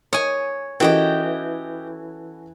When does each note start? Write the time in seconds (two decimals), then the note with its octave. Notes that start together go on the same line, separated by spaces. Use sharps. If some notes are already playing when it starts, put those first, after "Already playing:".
0.13 C#5 G#5 D#6
0.80 E3 C#4 F#4 G4 A4 D#5 G5